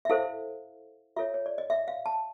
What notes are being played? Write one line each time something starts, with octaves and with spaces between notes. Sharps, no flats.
E5
E4 A4 C5 F5
F4 A4 C#5 E5
C#5
D5
D#5
E5
F5
A5